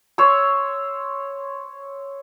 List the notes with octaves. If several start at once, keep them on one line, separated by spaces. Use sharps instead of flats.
C5 C#5 E6